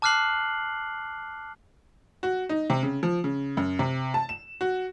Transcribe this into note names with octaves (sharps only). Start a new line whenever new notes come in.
A5 D6 F6 F#6 C7 F#7
F#4
D#4
C3
C#3
F3
C#3
F#2
C3
A5
E7
F#4